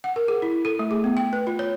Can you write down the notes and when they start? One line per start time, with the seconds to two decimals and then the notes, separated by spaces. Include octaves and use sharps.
0.04 F#5
0.16 A#4
0.28 G#4
0.42 E4
0.65 A4
0.79 A3
0.91 G#4
1.04 B3
1.17 G5
1.33 B4
1.47 F4
1.59 C#5